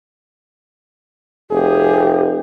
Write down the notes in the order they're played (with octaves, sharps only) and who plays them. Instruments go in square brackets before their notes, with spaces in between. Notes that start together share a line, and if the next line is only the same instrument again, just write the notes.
[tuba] F1 [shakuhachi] G4 [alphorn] G#4